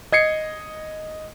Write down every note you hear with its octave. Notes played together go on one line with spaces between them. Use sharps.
D#5 G#6 C7 C#7